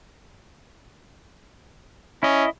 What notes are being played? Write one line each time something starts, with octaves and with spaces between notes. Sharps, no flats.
C#4 E4 D#5